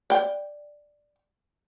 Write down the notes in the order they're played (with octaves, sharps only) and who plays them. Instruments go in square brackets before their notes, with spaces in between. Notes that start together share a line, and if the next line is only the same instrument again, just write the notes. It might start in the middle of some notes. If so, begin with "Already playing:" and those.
[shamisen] D5 G5